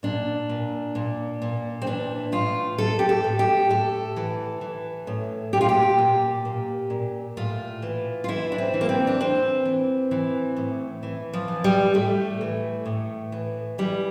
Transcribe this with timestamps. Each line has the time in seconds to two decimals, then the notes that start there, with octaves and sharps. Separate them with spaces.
0.03 A#2 D4
0.49 A#2
0.95 A#2
1.42 A#2
1.82 C4
1.86 E3 D4
2.32 A2 F4
2.78 A2 A4
2.99 G4
3.09 A4
3.24 A2
3.39 G4
3.69 A2 A4
4.16 E3
4.61 E3
5.07 A2
5.53 A#2 G4
5.61 F4
5.69 G4
5.98 A#2
6.45 A#2
6.90 A#2
7.37 A2 F4
7.82 E3
8.24 F4
8.28 E3 E4
8.52 D4
8.58 C4
8.74 E3
8.81 A#3
8.89 C4
9.07 D4
9.20 E3 C4
9.65 E3
10.11 E3
10.57 A2
11.03 E3
11.34 F3
11.48 E3
11.64 G3
11.94 A2 A3
12.41 E3
12.86 A2
13.32 E3
13.78 E3 G3